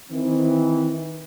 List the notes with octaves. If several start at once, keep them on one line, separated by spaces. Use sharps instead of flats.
D#3 E3 C4